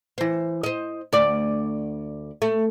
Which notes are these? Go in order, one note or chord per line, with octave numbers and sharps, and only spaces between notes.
E3 C5
C5 D#5
D2 D5
A3